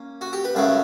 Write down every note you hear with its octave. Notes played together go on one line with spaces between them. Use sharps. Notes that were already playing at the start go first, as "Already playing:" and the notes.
Already playing: A#3 C#4
F#4
G4
B4
F#2 C#3 F#3 A3 B4